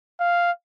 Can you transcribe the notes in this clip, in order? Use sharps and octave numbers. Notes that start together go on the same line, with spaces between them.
F5